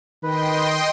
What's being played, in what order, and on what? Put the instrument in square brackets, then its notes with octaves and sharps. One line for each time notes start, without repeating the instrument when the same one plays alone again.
[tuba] D#3 [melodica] B4 [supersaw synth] D#5 G5 C6